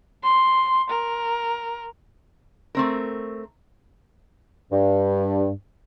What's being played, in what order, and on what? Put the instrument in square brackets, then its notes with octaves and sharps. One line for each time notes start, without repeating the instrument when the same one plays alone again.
[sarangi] C6
A#4
[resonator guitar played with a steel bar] A3 C4 A#4
[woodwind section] G2